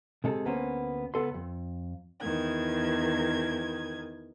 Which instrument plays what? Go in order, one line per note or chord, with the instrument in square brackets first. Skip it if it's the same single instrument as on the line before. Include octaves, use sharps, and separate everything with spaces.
[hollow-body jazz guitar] C3 G#3 A4
D2 A#3 B3 C#4 C5
C#2 B3 A4 C6
F2
[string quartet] E2 D#3 G#6